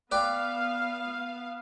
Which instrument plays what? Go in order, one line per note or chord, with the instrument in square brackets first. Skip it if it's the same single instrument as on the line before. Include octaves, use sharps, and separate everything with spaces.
[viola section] B3 F5 [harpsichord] B4 D5 G5